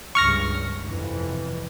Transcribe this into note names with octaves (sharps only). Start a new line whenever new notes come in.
C#2 G2 C#6 F6 A#6
F2 C3 E3